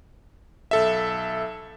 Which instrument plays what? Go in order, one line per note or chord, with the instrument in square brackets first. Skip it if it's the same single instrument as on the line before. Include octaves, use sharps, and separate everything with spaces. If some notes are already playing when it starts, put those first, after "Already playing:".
[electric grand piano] B1 A4 E5